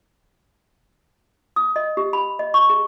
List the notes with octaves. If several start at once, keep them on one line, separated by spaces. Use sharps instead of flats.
D#6
D#5
G4
B5
D#5
C#6
G#4